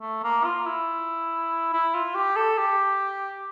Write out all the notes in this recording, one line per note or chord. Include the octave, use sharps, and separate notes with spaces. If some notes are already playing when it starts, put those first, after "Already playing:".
A3
A#3
F4
E4
E4
F4
G4
A4
G4